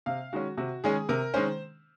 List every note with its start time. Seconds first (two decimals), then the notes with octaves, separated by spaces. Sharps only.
0.06 C3 F5
0.33 D#3 G#3 C#4 F#4
0.58 C3 F#4
0.84 D#3 G#3 C#4 G#4
1.09 C3 A#4
1.34 D#3 G#3 C#4 C5